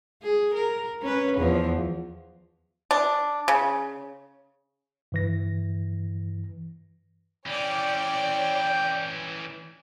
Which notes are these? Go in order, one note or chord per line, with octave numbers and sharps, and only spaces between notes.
G#4
A#4
C#4 B4
E2 F3
D4
C#3
G2 E3 A#6
E3 C#4 C#5 D5 G5